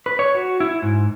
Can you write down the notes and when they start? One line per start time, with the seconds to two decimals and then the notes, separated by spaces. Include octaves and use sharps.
0.06 B4
0.19 C#5
0.35 F#4
0.60 E4
0.82 G#2